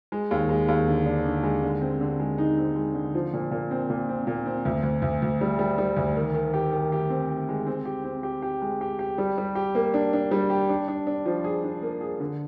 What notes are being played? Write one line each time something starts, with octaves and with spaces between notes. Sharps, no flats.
G#3
D#2
G#3
D#2
D3
D4
D3
G#3
D3
C4
D3
G#3
D#4
C4
G#3
D3
F3
A#2
A#2
C4
A#2
C4
A#2
C4
D2
D2
D2
D2
G3
G3
G3
D2
D#3
D#3
G4
D#3
G4
C4
G4
G#3
C4
G4
C4
G4
G4
G#3
G4
G4
G3
G3
G4
A#3
D4
D4
G3
G4
D4
D4
D4
F3
G#4
D4
A#3
G#4
D3